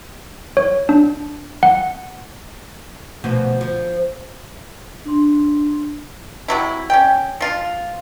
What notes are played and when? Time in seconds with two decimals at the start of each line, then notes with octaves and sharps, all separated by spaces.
0.57 C#5
0.89 D4
1.63 F#5
3.24 D2 B2 F3
3.61 F3
5.06 D4 C6
6.48 C3 F#3 E4
6.90 C#4 G5
7.41 F3 F4